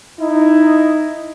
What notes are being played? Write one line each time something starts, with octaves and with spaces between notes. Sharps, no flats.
D#4 E4